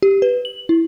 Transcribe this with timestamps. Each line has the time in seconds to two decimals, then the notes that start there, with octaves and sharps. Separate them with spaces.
0.02 G4
0.22 B4
0.45 F#7
0.69 E4